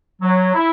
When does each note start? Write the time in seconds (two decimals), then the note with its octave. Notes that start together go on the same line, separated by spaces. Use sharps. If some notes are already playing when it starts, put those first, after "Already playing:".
0.22 F#3
0.54 E4